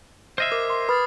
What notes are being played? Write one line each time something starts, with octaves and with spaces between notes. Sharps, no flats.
C5 D#5 E5 F6 G#6 C7
A#4 D6
C6
B4 B5 D#6 F6 A6 C7